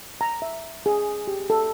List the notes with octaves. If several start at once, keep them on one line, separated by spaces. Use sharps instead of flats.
A#5
E5
G#4
G4
A4